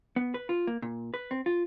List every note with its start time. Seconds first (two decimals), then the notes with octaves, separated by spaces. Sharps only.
0.16 B3
0.34 B4
0.49 F4
0.67 A#3
0.82 A#2
1.14 B4
1.31 C4
1.46 F4